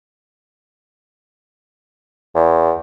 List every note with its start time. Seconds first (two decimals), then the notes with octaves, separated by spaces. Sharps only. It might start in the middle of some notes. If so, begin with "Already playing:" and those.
2.35 E2